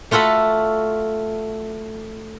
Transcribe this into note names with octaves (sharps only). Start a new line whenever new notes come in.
A3 F4 F#4 A4 B5